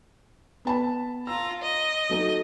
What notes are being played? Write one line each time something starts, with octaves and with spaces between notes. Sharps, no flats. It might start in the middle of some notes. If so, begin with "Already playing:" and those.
B3 A5 B5
F4 A#5 E6
D#5
F#3 A3 D#4